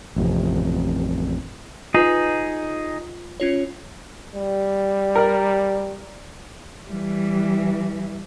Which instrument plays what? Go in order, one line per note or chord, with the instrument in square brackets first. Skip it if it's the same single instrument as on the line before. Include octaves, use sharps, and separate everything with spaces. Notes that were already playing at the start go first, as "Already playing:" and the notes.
[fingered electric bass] A1 F2 C3
[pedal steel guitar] D#4 G#4 [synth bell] F4 B4
[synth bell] C#4 F4 C#5
[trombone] G3
[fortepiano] A#4 D5
[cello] E3 G3